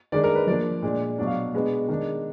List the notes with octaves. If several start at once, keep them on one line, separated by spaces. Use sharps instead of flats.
D#3 G#3 D4 D5
A#4
B4
F3 A#3 D4 D5
A#2 G#3 D4
B2 F#3 D4 D5
F5
B2 G#3 B3 D4
D#3 G#3 D4